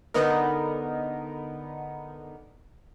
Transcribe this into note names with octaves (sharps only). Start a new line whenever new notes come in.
D3 B3 D#4 A#4